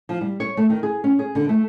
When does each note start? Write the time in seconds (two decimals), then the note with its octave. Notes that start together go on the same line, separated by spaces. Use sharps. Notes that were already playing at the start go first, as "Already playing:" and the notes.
0.09 F3
0.21 G3
0.40 C#5
0.57 A3
0.70 D#3
0.83 G#4
1.04 C#4
1.19 G#4
1.35 D3
1.49 A3